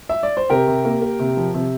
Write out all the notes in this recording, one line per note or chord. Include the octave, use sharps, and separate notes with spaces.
E5
D5
C5
C3 G4 A#4
C3
A#3
A#3
C3
F3
C3